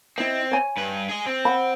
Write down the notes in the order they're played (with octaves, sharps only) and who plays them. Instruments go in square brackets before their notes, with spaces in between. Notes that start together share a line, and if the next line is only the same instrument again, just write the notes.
[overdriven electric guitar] C4 [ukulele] E4 D#5
[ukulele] C#5 G#5
[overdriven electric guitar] G2 B4
G#4 D#5
C4
[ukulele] F#5 B5